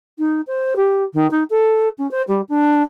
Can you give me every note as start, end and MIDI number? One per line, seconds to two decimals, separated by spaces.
0.18 0.41 63
0.47 0.74 72
0.76 1.03 67
1.14 1.29 51
1.30 1.43 63
1.50 1.88 69
1.98 2.09 61
2.11 2.22 72
2.28 2.41 55
2.49 2.82 62